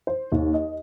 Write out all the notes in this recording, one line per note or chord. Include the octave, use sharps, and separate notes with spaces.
C5
D#2
D#5